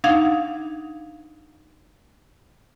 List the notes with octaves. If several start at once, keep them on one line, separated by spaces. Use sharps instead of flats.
D4 D#4 F5 F#5 G#6